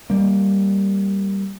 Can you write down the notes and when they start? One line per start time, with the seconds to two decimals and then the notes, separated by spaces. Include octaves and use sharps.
0.10 G3 A#3